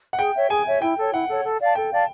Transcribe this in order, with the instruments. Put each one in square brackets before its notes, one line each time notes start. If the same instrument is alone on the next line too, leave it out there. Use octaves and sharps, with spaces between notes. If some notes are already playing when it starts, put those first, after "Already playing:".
[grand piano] F#5
[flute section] G#4 [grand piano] G5
[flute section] C#5 E5
[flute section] G#4 [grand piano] G#5
[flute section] C#5 E5
[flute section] E4 [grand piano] G5
[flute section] A4 C#5
[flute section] E4 [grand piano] F#5
[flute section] A4 C#5
A4
D5 F5 A5
[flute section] A4 [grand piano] G5
[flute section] D5 F5 A5